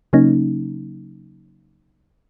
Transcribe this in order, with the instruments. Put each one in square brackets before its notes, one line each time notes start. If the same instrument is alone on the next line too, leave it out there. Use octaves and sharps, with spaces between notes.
[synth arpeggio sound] C#3 F#3 A#3 C#4 D#4